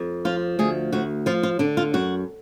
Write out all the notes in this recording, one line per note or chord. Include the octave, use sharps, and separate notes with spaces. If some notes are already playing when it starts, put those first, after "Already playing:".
Already playing: F2
F3 F4
D2 G#4
D2 F#4
F3 F4
F4
D3 D4
F4
F#2 F#4